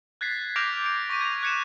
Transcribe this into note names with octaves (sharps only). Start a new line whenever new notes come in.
F#6 G#6 A6 B6 C7
D6 F6 G6 A#6 D7 F7
D7
C#6 A#6 B6 D#7
G#6 A#6 F7
F#6 G#6 C#7 D#7 E7